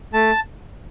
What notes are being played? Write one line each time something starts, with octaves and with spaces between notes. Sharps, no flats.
A3 A5